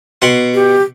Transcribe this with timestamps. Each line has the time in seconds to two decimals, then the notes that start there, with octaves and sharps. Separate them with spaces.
0.22 B2 F#5 C6
0.54 G4